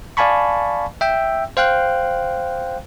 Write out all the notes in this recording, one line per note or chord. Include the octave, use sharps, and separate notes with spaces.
D5 F5 G#5 A5 B5 C#6
E5 G5 E6
C5 F5 G5 F#6